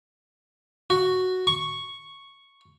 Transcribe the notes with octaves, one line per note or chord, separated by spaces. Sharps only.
F#4
C#6